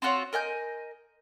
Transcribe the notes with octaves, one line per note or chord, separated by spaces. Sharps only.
C4 F4 F#4 C#5
A#4 D#5 G#5 G6